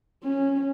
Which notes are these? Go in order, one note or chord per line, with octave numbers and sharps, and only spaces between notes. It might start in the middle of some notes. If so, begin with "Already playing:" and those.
C#4